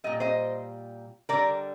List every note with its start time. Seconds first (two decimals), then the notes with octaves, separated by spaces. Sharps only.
0.04 A#2 G3 D#5
0.20 C5 D#5
1.29 D3 G3 A#4 D5